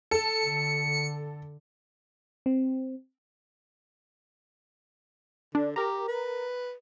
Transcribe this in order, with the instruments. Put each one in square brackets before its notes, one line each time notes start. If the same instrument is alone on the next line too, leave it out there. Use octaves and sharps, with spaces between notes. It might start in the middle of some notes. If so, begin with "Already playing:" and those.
[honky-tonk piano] A4 [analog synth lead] C#7
[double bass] D3
[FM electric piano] C4
[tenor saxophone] D3 [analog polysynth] D4
[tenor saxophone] G4 [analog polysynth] A#4 A#5
[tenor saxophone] B4